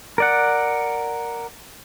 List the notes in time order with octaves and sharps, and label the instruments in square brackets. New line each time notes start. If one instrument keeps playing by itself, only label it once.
[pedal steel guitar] A#4 D5 F#5